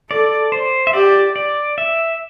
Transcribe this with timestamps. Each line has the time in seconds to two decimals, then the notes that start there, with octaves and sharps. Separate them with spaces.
0.10 A4 D5
0.52 C5
0.87 E5
0.93 G4 D5
1.36 D5
1.78 E5